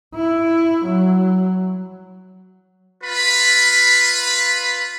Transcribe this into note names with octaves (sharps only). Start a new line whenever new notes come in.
E4
F#3
F4 B4 B5